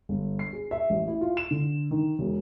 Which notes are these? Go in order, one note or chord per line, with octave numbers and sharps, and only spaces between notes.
G1
C7
G#4
E5
A1
E4
F4
E7
D3
D#3
E1